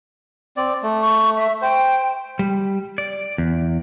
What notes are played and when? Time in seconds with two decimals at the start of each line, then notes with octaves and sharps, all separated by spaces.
0.57 C4 D5
0.82 A3
1.02 C#6
1.36 E5
1.62 C5 G5
2.39 G3
2.98 D5
3.38 E2